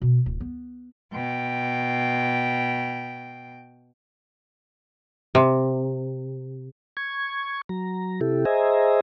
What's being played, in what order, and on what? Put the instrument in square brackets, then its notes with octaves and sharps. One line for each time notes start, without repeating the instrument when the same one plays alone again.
[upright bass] B2
D1
B3
[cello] B2 G5
[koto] C3
[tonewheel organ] C#6 G#6
F#3 A#5
C3 E4 G4 A4
G#4 C5 D#5 E5 G#5 A#5